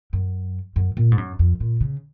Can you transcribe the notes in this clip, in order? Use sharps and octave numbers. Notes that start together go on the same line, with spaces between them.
F#2
F#2
A#2
G#2
F#2
F2
A#2
C#3